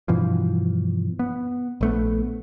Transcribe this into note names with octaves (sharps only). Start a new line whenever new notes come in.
G2 B2 E3 F3
B3
A#1 A3 B3